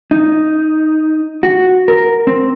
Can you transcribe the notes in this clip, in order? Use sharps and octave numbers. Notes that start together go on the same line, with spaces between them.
D#4
F#4
A#4
C4